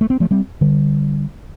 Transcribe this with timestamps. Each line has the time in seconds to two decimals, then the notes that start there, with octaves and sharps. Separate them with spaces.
0.01 A3
0.10 C4
0.20 F3 A3
0.31 G3 C4
0.61 D3 G3